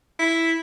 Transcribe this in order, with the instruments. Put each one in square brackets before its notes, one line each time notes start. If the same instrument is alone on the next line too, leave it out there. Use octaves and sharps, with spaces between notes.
[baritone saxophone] E4